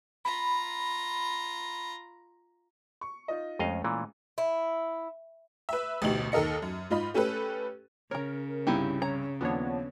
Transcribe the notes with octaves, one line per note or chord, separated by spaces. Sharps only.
F4 A#5 B5
C#6
D#4 F4 D#5
F2 G#3 A3 C#4 D#5 F5
A#2 E3
E4
B4 E5
A1 D2 B2 D#4 G4 F#7
D#2 A4 A#4 D#5 C#7
F#2
G#2 F4 D#5 B5
A3 C#4 G4 A4 B4
C#3 A#4 C#5 A#5
C2 G2 D#4 E4 G4
C#5 A#5
D#2 F3 B3 D4 C#5